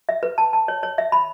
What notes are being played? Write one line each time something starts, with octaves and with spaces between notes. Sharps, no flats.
E5
B4
A5
A5
C#5
C#5
E5
B5